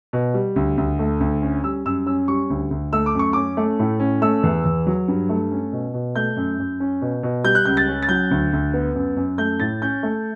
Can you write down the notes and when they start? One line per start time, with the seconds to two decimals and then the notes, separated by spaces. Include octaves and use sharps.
0.13 B2
0.34 G3
0.56 D2
0.77 D2
0.99 A3
1.20 D2
1.42 C#4
1.64 G3 E6
1.86 F#2 E6
2.06 C#4 E6
2.28 G3 C#6
2.50 D2
2.71 D2
2.93 A3 E6
3.06 D6
3.15 F#2 C#6
3.33 C#4 D6
3.57 A3
3.79 A2
4.00 C#4
4.22 A3 E6
4.43 E2
4.65 E2
4.87 F#3
5.08 G2
5.29 A3
5.51 C#4
5.73 B2
5.94 B2
6.15 A3 G6
6.37 F#2
6.59 F#2
6.80 C#4
7.02 B2
7.23 B2
7.44 G3 G6
7.55 F#6
7.65 C#2 G6
7.77 A6
7.88 C#4
8.02 A6
8.09 F#3 G6
8.31 D2
8.53 D2
8.74 B3
8.95 F#2
9.17 F#2
9.38 A3 G6
9.59 A2 A6
9.82 C#4 G6
10.03 A3